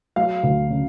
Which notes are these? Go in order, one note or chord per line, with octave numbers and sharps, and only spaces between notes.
F#3 F5
D2
C#3